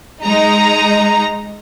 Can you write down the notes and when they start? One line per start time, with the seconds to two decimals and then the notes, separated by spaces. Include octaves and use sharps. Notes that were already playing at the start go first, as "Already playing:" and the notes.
0.24 G#3 D#4 A#5